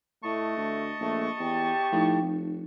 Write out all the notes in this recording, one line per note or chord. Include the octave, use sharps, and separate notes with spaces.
A2 A3 D#5 A5 C#6
D2
A#1 A3
E2 G4
A2 F3 D#4
F1